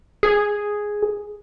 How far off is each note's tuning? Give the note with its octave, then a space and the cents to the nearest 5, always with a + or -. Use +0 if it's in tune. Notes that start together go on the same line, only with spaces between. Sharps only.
G#4 +0